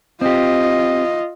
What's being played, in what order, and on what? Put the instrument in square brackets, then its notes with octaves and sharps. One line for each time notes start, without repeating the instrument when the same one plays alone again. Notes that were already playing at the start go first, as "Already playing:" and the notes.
[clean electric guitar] C4 G4 [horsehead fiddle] F4 D#5